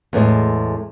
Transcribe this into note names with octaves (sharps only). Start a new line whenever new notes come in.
E2 A2 G#3